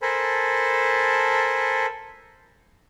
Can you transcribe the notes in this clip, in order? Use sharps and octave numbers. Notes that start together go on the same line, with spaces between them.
A4 A#4 C5 G#5 A5 B5